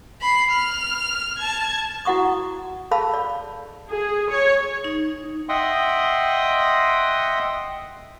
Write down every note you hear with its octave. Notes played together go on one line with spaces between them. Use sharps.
B5 C7
F6
A5 G#6
E4 F#4 F#5 C#6 D#6
G#4 A4 F5 A5 B5 E6
D5
G#4
C#5
D#4
D#5 E5 F#5 G5 C6 D#6